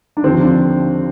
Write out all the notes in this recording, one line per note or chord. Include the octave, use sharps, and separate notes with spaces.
D4
D#2 D3 F3 C4
D4